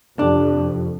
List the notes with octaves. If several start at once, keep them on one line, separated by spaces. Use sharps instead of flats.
F2 C3 D4 G4 A4